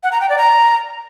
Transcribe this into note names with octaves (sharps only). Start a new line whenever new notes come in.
F#5
A#5
G5
D5
A#5